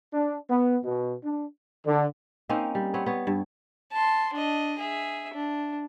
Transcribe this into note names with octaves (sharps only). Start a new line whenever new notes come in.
D4
B3
B2
D4
D3
A#3 C4 C#4 D#4
G3
B3 C4 C#5
B3 C#5
G2
A5 C6
D4 D#5
G#4 E5
D4